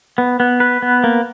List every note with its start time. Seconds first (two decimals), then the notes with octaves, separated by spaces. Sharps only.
0.18 B3
0.40 B3
0.60 B4
0.82 B3
1.04 A#3